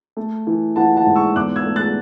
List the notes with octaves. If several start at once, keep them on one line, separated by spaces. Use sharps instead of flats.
A3
E3
E3 F#5 A5
F#5 A5
G#2
C#6 E6
E2 D6 F#6
E6 G#6
A3
F#6 A6